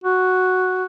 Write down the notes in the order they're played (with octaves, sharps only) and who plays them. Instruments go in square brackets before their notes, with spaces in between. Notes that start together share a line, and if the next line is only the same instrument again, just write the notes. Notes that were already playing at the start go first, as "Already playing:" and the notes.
[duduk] F#4